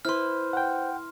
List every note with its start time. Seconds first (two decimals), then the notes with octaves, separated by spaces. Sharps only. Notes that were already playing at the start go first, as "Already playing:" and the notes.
0.05 E4 B4 C5 C6 F6
0.53 F#5 G5